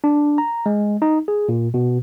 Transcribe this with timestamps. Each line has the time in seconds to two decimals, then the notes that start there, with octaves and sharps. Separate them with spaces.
0.04 D4
0.38 A#5
0.66 G#3
1.02 D#4
1.28 G#4
1.49 A#2
1.74 B2